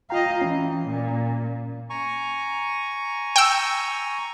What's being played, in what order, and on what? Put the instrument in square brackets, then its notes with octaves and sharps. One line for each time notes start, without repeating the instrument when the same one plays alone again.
[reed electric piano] F4 G5 A#5 [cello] D#5 F5
[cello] E3 [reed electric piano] C#4
[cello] A#2
[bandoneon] G#5 A#5 C#6
[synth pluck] G5 E6